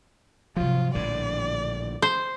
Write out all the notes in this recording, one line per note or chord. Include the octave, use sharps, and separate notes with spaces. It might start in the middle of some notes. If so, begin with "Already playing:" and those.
G#2 C3 F3 F#3 F4
A#1 A2 D3 D#3 G3 D5
C5